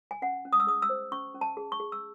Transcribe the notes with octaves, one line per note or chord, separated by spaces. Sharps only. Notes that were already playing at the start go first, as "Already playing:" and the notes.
G#5
C#4 F#5
C#4
D#6
E6
G#4 D#6
E6
C5
C#4 C#6
C#4
A5
G#4
C#6
G#4
E6